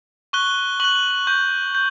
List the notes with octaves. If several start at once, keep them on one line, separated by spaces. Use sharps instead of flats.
C#6 F#6 G7
C#6 F#6 F#7
C#6 G6
G6